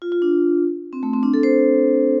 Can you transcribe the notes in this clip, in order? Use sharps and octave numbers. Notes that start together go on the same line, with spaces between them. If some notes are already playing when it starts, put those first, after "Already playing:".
F4
F4
D4
C4
A3
C4
D4
A4
C5